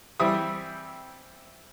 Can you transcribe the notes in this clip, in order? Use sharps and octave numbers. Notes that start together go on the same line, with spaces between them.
E3 G3 C4 E5 D#6